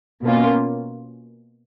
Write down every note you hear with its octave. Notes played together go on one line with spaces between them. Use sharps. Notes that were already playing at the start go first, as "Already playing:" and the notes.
B2 A#3 C#4 F4